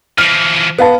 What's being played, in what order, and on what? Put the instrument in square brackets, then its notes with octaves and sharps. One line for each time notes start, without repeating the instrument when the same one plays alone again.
[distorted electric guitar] E3 F3 [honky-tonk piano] F6
[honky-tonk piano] B3 [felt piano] B4 F5 A5